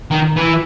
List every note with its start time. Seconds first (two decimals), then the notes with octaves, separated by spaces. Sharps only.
0.11 D#3
0.36 E3